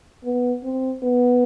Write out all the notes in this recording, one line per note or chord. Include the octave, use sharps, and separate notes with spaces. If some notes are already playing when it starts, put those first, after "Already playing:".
B3
C4
B3